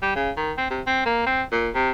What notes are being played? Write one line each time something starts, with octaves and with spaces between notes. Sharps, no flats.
G3
C#3
D#3
C4
C3
C4
A#3
C4
A#2
C3